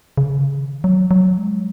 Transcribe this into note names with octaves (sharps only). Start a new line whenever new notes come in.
C#3
D#3
F#3
F#3
G#3